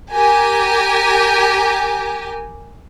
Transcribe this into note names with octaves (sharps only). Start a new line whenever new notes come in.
G4 A#4 G#5